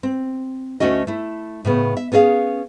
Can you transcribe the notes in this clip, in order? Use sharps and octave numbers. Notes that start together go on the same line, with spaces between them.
C4
D2 D3 A3 C#4 F#4 D#5
A3 E4
A2 C#3 B3
E5
B3 C#4 G#4 D#5 F5